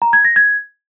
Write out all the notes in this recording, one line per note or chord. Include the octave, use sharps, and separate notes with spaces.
A#5
G#6
A#6
G#6